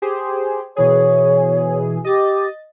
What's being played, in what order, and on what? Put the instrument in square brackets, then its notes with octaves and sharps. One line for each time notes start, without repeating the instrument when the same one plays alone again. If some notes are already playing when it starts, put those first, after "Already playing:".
[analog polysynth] G4 G#4 C5
[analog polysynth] B2 E3 G#4 [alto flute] C#5
[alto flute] G4 [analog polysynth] D#5 A6